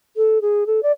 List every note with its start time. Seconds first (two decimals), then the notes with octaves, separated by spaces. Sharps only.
0.17 A4
0.41 G#4
0.67 A4
0.83 D5